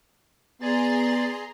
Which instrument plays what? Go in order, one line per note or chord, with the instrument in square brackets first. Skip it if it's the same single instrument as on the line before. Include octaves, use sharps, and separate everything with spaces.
[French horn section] B3 [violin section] G#4 A#5 C6 [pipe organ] D5 A6